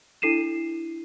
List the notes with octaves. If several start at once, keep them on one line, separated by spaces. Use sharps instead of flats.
D4 E4 A4 C7 D#7 E7